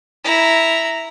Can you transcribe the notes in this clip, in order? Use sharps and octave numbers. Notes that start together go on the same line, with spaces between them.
E4 A#5